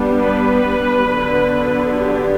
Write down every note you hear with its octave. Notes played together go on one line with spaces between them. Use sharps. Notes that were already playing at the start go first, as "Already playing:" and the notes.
Already playing: G3 B3 D4
B4
D3 F#3 B3 D4
G4